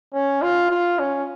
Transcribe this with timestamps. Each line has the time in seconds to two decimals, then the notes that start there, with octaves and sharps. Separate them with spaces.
0.14 C#4
0.42 F4
0.70 F4
0.99 C#4